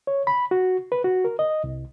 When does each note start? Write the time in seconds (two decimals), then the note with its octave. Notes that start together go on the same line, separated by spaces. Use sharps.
0.07 C#5
0.27 B5
0.51 F#4
0.92 B4
1.04 F#4
1.25 A#4
1.39 D#5
1.64 C2